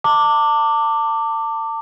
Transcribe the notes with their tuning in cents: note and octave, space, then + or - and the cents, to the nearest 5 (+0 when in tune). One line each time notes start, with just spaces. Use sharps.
A5 +35 D6 +0